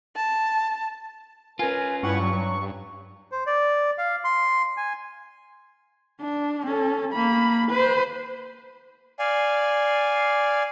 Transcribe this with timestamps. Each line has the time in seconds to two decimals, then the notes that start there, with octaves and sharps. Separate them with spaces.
0.16 A5
1.59 C#4 F4 A#4 B4 G#5
2.03 G2 E4 B4 F#5 C#6
2.20 F#3
3.32 C5
3.46 D5
3.98 F5
4.24 C6
4.77 G#5
6.21 D4
6.66 C#4 A4
7.13 A#3 B5
7.71 B4 C5
9.19 D5 F5 G#5